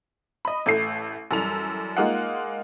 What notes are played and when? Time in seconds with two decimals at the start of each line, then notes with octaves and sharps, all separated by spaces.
0.45 D#5 B5
0.66 A1 A3 C7
1.31 F#2 E3 G3 A4 F7
1.97 G#3 A#3 D#4 F4 F#5